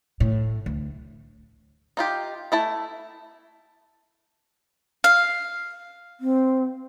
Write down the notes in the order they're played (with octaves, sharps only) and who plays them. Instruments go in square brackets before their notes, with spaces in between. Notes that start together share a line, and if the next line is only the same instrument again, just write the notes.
[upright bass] A2
D2
[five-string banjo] D#4 F4 G4
A3 E4 A5
[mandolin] F5
[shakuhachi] C4